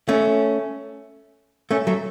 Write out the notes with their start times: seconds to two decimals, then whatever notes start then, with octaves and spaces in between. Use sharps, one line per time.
0.09 A3 C#4
1.71 A3 C#4
1.87 F#3 A3